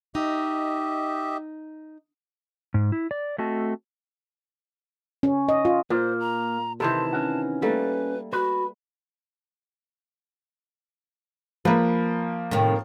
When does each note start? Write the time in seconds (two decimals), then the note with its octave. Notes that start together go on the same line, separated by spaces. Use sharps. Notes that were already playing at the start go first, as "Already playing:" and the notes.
0.15 D#4 G4 D#5 E5
2.74 G#2
2.92 E4
3.11 D5
3.38 A3 C4 F#4 D#5 A5
5.23 C#4
5.49 D#5
5.65 F4
5.90 A#2 A#3 C5
6.20 A#5
6.80 C3 D#3 E3 A4 C5 A5
7.13 C#4 F#4
7.62 G3 A3 A#3 B4
8.33 F#4 B4
11.65 F3 A#3 B4
12.51 A2 C3 D#3